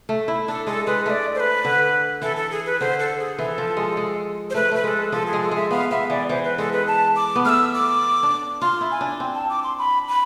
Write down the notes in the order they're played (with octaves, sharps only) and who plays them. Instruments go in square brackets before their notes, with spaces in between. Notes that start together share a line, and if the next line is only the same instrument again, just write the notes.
[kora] A3
E4
[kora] D4 [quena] A4
[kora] G#3 [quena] A4
[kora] G#3 [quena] B4
[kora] A3 [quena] E5
[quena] D5
C5
B4
[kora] D3
[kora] E3 [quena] A4
[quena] A4
G#4
B4
[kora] D3 [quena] C5
[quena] A4
G#4
[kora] E3 [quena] A4
[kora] F3
G#3
G#3
[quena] C5
[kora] A3 [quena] B4
[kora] A3 [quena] B4
[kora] G#3 [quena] B4
[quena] A4
[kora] F3 [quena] A4
[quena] G#4
[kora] G#3
[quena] A4
[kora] G#3 [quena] E5
[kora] B3 [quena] F5
[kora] B3 [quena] E5
[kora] E3 [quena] D5
[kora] E3 [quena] C5
[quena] B4
[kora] G#3 [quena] A4
[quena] B4
A5
D6
[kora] B3
[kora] A3 [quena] E6 F6
[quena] D6
[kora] D4
[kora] F4 [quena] C6
[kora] E4
[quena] G#5
[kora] D4
C4
[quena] A5
D6
C6
B5
B5